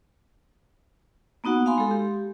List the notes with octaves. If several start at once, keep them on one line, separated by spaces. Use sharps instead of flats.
A#3 B3 D#4 F#4 F#5
F5 G#5 B5 C6
G#3 A4
G4